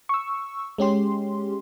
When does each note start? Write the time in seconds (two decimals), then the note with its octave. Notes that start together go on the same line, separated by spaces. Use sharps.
0.09 C#6 E6
0.78 G#3 C#4 G4 C6